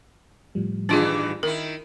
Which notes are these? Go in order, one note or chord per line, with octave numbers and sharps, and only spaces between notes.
A2 F3 G3
G2 D#3 E3 D4 F4 G#4
D#3 E4 A#4